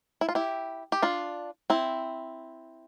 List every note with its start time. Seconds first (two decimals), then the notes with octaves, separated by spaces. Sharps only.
0.21 E4
0.29 F4
0.35 E4 G4
0.92 G4
1.02 D4 F4
1.70 C4 E4